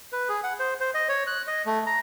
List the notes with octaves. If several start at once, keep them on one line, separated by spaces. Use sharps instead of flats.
B4
G#4
F#5
C5
C5
D#5
C#5
F#6
D#5
A3
A#5